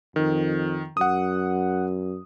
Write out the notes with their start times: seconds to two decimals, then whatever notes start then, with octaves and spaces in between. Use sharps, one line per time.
0.16 F2 D#3
0.97 F#2 F#5 D#6